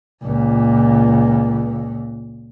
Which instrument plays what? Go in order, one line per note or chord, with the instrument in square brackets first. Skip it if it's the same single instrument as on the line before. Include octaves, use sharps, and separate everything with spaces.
[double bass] C#2 A#2